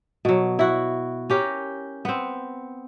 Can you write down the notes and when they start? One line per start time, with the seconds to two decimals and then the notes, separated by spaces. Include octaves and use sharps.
0.25 B2 F#3
0.59 E4 F#4
1.30 C#4 G4 A#4
2.05 B3 C4